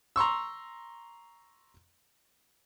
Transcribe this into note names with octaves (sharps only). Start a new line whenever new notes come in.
A#5 C6 C#6 E6